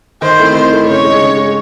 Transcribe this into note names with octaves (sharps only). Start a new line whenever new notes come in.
D#3 C5
A3 C4 E4
D#3 C5
A3 C4 E4
C#3 C#5
G#3 D#4
C#3
G#3 D#4